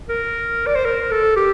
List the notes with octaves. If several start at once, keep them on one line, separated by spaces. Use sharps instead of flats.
A#4
D5
C5
A#4
A4
G4